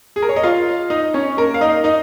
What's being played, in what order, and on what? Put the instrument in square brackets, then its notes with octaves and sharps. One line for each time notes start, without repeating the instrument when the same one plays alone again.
[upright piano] G#4
A#4
C#5
D#5
F4 F5
D#4 D#5
C#4 C#5
A#3 A#4
F5
D#4 D#5
D#4 D#5